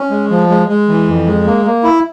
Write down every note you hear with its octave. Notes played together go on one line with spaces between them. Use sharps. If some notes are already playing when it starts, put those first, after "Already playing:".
Already playing: C#4
G#3
F3
G#3
G#3
E3
F2
G#3
A#3
A#3
E4